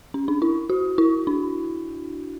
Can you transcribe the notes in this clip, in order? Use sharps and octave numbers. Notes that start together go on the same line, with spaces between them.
C#4
D4
E4
F#4
E4
D4